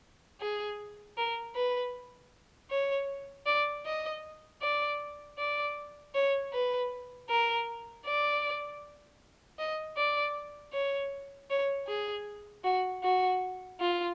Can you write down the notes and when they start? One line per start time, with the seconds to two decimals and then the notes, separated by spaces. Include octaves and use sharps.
0.40 G#4
1.17 A#4
1.55 B4
2.71 C#5
3.46 D5
3.86 D#5
4.62 D5
5.38 D5
6.15 C#5
6.53 B4
7.29 A#4
8.06 D5
9.59 D#5
9.96 D5
10.73 C#5
11.50 C#5
11.88 G#4
12.64 F#4
13.03 F#4
13.80 F4